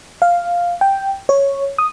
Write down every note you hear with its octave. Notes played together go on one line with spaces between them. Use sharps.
F5
G5
C#5
D#6